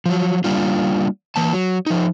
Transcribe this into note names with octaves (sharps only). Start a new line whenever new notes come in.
F3 F#3
G3 A#3 D4 F4
E3 A#3 A5
F#3
F3 D#4